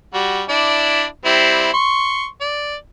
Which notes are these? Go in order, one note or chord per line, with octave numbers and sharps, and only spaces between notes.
G3 F#4
D4 E4 D5
G3 C4 E4
C6 C#6
D5